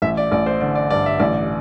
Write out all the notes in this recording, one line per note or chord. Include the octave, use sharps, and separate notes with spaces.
A1 E5
D5
A1 D5
C5
D3 D5
D5
G2 D5
E5
A1 D5